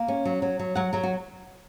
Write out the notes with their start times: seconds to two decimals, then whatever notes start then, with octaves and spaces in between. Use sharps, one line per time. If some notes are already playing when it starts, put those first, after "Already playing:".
Already playing: A#3
0.08 C#4
0.25 F#3
0.42 F#3
0.59 F#3
0.75 F#3 F#5
0.93 F#3 A#4
1.03 F#4